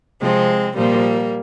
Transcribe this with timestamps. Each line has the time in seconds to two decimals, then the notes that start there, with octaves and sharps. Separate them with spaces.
0.21 C3 F3 G#3 C4
0.76 A#2 F3 G3 A#3